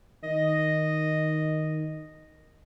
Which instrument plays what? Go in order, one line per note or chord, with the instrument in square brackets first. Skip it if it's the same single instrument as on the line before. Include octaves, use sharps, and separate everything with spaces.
[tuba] D#3 [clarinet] D#5